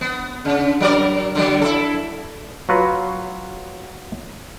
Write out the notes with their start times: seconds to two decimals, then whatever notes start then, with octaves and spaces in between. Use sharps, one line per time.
0.01 B3
0.45 C#3
0.81 F#3 A#4 D5
1.35 D3 F#3
1.62 E4 A4
2.69 F#3 F4 F#4 B4